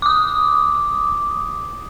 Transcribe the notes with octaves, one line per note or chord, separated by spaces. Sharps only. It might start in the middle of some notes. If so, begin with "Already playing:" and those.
D6 D#6